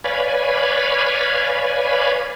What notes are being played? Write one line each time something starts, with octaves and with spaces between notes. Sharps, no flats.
B4 C#5 D5 F5 G#5 B5